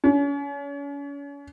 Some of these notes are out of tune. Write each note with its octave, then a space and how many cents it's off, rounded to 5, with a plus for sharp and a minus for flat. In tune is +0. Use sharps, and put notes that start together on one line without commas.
C#4 +35